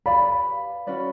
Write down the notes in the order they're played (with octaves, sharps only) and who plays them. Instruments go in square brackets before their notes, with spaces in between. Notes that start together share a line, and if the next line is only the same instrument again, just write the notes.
[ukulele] G4 B4 D5 F5 [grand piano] B5
[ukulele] C#4 F#4 B4 D5